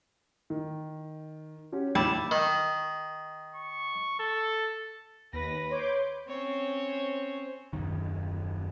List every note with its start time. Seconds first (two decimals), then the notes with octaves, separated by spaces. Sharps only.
0.50 D#3
1.72 C#4 F#4 G4
1.95 D#2 G3 E4 A5
2.31 D#3
3.56 C#6
4.20 A4
5.33 D#2 B4 A#6
5.70 C#5 C6 D6 G6
6.28 C4 C#4 C5 C#5
7.73 D#1 B1 F#2 D#3